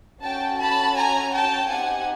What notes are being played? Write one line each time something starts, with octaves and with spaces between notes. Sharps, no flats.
C#4 F#4 A4 G5 A5
A5 B5
G#5 A#5
G5 A5
C4 D#4 G4 F#5 G#5